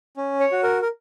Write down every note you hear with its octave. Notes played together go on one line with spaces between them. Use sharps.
C#4
C#5
F#4
A#4
A#4